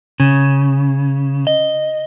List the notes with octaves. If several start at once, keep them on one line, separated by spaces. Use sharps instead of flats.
C#3
D#5